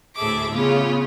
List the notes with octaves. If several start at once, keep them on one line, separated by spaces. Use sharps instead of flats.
D2 A2 G#4 A4 E5 D6
C#3 B3 C#4 F4 G#4